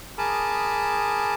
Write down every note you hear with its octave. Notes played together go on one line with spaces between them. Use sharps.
G#4 A#4 A5 B5 D6 D#6